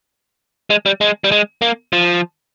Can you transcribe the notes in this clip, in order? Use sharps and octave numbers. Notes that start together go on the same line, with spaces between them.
G#3
G3
G#3
G3
G#3
A#3
F3